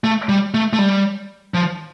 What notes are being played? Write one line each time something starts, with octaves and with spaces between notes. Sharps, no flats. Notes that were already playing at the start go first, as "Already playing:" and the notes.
A3
G3
A3
A3
G3
F3